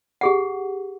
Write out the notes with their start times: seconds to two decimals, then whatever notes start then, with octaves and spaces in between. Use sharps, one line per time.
0.21 G4 G#4 F#5